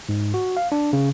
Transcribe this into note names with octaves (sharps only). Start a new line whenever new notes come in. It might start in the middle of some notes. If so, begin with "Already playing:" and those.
G#2
F#4
F5
D4
C#3